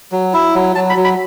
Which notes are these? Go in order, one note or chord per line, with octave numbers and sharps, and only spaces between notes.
F#3
E4
F#3
F#3 A5
B5
F#3
B5